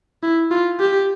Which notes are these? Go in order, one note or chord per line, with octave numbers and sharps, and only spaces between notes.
E4
F4
G4